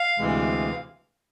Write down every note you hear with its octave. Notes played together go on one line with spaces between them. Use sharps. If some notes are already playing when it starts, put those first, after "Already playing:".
Already playing: F5
D2 C3 E3 G#3